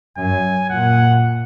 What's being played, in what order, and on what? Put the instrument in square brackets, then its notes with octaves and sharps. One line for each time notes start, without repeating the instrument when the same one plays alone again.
[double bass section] F#2 [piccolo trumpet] G#5
[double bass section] A#2 [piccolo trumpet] F#5